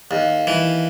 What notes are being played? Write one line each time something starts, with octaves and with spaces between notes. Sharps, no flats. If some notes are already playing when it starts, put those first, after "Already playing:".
D#2
E3